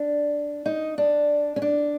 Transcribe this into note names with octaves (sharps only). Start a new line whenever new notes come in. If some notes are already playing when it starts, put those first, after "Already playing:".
Already playing: D4
D#4
D4
C#4
D4